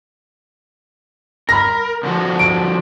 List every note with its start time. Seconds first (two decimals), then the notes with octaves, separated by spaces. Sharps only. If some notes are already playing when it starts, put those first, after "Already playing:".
1.49 A#4 B5 F6 A#6
2.03 D3 F3 F#4
2.39 D7